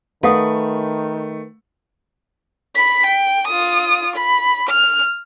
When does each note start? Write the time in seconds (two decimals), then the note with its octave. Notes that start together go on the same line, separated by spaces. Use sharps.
0.23 D#3 A3 B4 F5 F#5 D#6
2.75 B5 B6
3.06 G5
3.47 F4 D#6
4.16 B5
4.69 F6